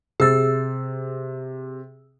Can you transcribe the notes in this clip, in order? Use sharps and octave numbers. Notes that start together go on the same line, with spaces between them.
C3 G#4 E6 A6